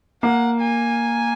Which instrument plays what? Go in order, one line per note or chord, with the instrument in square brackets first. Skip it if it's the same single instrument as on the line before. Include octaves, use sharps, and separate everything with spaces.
[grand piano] A#3 [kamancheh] F#5
[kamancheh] G#5